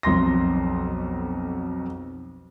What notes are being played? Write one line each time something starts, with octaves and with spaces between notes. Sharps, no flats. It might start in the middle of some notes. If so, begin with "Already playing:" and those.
B1 F2 C6 A#6